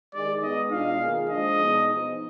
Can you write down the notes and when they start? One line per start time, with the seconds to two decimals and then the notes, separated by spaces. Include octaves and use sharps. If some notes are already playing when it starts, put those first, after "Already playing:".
0.14 D#3 G#3 D#4 G#4 D5
0.43 G#3 B3 D#4 D#5
0.72 B2 G#3 D4 F4 F5
1.01 D#3 A#3 F4 G#4
1.30 F3 G#3 D4 D#5
1.58 B2 G#3 B3 D#4 G#4
1.88 F3 B3 D#4